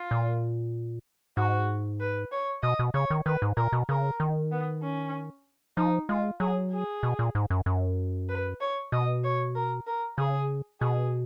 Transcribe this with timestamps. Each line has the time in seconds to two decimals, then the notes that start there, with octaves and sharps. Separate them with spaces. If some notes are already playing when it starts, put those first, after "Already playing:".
Already playing: F4
0.11 A#2
1.37 G#2 F#4
2.00 B4
2.32 C#5
2.63 B2 D#5
2.79 B2
2.94 C#3 C#5
3.10 D#3
3.26 D#3 B4
3.42 G#2
3.57 A#2 A#4
3.72 B2
3.89 C#3 A#4
4.20 D#3
4.52 B3
4.83 C#4
5.77 F3 D#4
6.09 G#3 F4
6.40 F#3 G#4
6.72 G#4
7.03 B2
7.19 A#2
7.35 G#2
7.50 F#2
7.66 F#2
8.29 B4
8.61 C#5
8.92 B2 D#5
9.24 C#5
9.55 A#4
9.87 A#4
10.18 C#3 G#4
10.80 B2 G#4